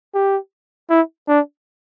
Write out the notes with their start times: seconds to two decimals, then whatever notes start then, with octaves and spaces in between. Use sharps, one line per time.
0.14 G4
0.90 E4
1.28 D4